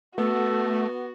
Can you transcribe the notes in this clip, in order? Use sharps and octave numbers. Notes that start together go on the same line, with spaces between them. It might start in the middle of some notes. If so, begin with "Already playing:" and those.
A3 B3 F#4 A4